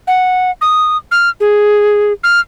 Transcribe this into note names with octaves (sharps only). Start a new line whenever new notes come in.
F#5
D#6
F6
G#4
F6